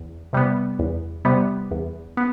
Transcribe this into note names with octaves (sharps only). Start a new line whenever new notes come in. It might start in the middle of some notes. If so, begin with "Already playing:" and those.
Already playing: E2
C3 G3 B3
E2
C3 G3 B3
E2
B3